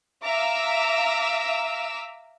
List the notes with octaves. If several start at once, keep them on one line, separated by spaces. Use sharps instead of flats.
E5 F5 A#5 D6 E6